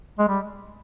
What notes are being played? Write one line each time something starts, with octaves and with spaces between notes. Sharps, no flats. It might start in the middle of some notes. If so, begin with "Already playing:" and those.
G#3
G3